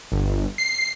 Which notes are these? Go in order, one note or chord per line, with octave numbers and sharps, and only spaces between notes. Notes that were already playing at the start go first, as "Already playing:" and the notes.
G1
C7